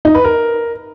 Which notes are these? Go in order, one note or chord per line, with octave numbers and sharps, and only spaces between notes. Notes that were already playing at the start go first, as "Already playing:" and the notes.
D#4
B4
A#4